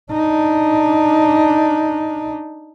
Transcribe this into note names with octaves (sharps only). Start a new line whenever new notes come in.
D4 D#4